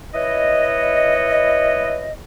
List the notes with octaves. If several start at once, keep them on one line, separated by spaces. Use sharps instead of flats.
E4 B4 C#5 D#5